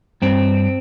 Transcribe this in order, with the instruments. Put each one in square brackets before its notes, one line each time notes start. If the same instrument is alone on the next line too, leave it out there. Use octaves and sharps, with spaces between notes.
[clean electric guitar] G2 C4